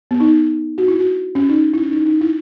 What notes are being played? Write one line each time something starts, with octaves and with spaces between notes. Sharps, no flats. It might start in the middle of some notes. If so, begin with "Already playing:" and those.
B3
D#4
F#4
E4
F#4
C#4
D#4
E4
C#4
D#4
D#4
E4